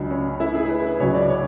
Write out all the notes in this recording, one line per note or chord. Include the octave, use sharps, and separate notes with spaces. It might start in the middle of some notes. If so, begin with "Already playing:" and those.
Already playing: C#2 C#3 F#3 D4
C#4
E4
G#4
B4
C#2 C#3 F#3 C#5
D5
C#5